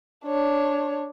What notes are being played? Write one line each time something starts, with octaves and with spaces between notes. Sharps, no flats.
D4 C#5